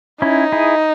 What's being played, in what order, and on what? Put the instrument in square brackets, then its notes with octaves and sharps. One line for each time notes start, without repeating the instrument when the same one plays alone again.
[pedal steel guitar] C#4 E4 [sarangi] D#4
[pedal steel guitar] E4 G#4